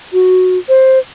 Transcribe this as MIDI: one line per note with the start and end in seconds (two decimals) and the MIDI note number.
0.13 0.58 66
0.69 0.99 72